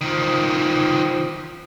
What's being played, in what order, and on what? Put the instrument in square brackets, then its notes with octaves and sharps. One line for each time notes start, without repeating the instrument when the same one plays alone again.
[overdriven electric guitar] D#3 F3